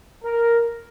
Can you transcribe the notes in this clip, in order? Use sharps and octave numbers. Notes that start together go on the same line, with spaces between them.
A#4